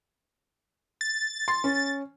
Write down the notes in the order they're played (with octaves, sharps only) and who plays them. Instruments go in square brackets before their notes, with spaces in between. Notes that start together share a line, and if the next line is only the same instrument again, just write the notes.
[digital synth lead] A6
[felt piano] C6
C#4